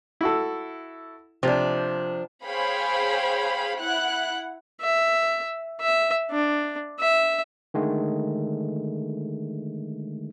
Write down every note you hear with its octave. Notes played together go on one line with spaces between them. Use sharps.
E4 F#4 A4
C3 F3 D4
G#4 C5 C#5 F5 G5 B5
E4 F#5 F#6
E5
E5
D4
E5
D3 D#3 G#3 A3